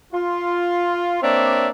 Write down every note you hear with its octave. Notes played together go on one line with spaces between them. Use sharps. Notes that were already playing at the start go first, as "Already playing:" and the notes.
F4
A#3 C4 D4 C#5 D5 E5